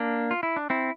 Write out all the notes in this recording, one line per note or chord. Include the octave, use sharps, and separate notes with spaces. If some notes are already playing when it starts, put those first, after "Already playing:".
Already playing: A#3 D4
F4
E4
D4
C4 E4